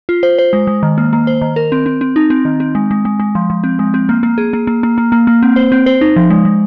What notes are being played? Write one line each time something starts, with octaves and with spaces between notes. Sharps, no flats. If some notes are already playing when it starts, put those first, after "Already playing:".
F4
C5
C5
G#3
G#3
D#3
A#3
A#3
C5
D#3
A#4
C4
C4
C4
D#4
C4
D#3
C4
G#3
G#3
G#3
G#3
F3
F3
C4
G#3
C4
A#3
A#3
G#4
A#3
A#3
A#3
A#3
A#3
A#3
C4
C5
C4
C5
D#4
F3
G#3
G#3